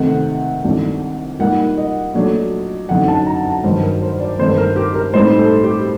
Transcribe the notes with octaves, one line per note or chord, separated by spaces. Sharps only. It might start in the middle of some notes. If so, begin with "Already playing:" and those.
Already playing: C3 D#3 A3 C4 F#5
C2 C3 D#3 A3 D4
A#2 G3 A#3 D#4 F#5
D#5
A#2 F#3 A3 D4
F#2 D3 F#3 C4 D#4 F#5
A5
A#5
A5
G2 D#3 F#3 C5
A#4
C5
D5
G2 D#3 A3 C4 C5
A#4
G4
A#4
A2 G3 C4 D#4 C5
A4
G4